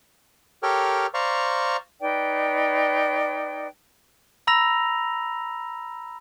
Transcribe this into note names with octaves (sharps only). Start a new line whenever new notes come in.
G4 A4 A#4 C#5 G5 F6
C5 D5 F5 A#5 C#6
D#4 B4 D5 G5
A#5 B5 E6 A#6 F7